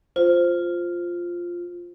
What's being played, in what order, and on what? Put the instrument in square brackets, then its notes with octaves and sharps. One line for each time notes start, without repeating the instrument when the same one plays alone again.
[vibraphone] F4 [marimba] C5